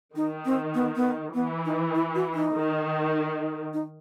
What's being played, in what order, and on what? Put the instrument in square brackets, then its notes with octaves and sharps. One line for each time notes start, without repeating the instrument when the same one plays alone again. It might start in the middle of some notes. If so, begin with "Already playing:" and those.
[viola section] D#3 [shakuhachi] D#4
[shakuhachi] C4
B3
B3
[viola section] E3 [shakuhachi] B3
[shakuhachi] D#4
E4
F#4
D#4
[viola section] D#3
[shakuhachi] D#4